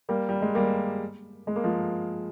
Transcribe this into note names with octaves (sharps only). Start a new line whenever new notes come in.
G3 A#3
G3
G#3
G3 A#3
G#3
A#3
F3 G#3